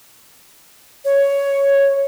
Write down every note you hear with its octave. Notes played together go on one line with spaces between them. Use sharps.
C#5